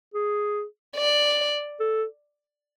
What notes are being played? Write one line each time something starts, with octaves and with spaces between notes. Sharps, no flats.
G#4
D5
A4